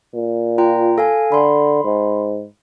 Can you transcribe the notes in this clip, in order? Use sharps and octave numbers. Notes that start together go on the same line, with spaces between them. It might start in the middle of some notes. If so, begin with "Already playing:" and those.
A#2
F4 G5 A#5
A4 F5 G#5
D3 B5 C6
G#2